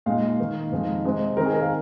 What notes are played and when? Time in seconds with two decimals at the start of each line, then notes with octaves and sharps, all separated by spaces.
0.06 A#2 G#3 D#4 F5
0.39 D#3 A#3 D#4
0.72 F2 D#3 G#3 D#4
1.05 C3 G#3 C4 D#4
1.37 D#3 C4 D#4 A#4
1.45 G#4
1.53 A#4
1.61 F5